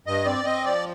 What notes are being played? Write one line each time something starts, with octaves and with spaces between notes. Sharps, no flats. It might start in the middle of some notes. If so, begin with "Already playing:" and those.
G2 D#5
C4 D5
C4 D#5
F3 D5